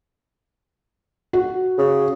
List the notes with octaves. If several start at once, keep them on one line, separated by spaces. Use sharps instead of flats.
F#4
C#3